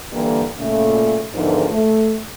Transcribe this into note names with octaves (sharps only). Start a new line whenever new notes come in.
D3 E3 G3 A#3
A#2 C#3 A3
E2 G#2 D3 D#3 F3
A3